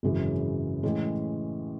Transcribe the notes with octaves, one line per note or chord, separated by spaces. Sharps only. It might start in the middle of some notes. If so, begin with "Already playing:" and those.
G#1 F#2 C#3 E3
A2 E3 G#3 C#4